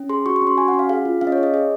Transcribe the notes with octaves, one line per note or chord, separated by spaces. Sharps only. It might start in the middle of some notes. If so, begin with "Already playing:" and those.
Already playing: C#4
G#4 C6
F#4 C#6
C#6
C#4
C6
F#4 G#5
F#5
C#4
F5
G#4 F5
F4
C#4 F5
D#5
C#5
G#4
D#5
G#4 D#5